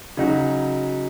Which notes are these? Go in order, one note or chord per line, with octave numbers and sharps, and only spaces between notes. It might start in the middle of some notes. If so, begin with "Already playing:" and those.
C#3 F#3 D#4 F#4